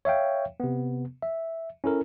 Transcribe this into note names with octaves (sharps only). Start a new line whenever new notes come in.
C#5 E5 F5 G5
C3 B3
E5
C#4 E4 A4 A#4